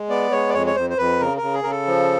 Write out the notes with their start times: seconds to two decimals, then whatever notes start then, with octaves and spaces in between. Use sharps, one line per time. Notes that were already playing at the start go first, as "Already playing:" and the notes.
Already playing: G#3
0.10 B3 D5
0.31 G#3 C#5
0.49 D5
0.53 F2 C#5
0.67 C#5
0.76 F2 C5
0.90 C5
0.98 F2 B4
1.20 C#3 A#4
1.37 C#3 A#4
1.54 G#4
1.63 C#3 A#4
1.70 A4
1.87 F3